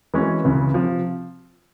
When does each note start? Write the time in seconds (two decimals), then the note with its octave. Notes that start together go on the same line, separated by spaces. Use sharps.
0.14 E3 G#3 C#4 F#4
0.44 C#2 C#3 E3
0.74 C3 F3